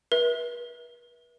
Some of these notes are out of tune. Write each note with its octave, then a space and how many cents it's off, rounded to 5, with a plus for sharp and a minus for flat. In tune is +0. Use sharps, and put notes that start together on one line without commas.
B4 -40 E5 -20